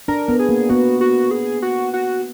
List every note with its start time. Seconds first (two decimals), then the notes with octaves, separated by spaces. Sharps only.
0.08 D4 A#4
0.28 B3
0.39 G#4
0.49 A#3
0.69 B3 F#4
1.01 F#4
1.31 G#4
1.62 F#4
1.93 F#4